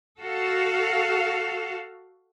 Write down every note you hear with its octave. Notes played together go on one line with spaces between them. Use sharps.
F#4 A4 F5